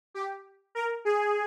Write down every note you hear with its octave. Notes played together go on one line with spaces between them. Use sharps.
G4
A#4
G#4